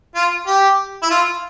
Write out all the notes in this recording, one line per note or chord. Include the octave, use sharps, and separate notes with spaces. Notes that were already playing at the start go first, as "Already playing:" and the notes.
F4
G4
E4
F4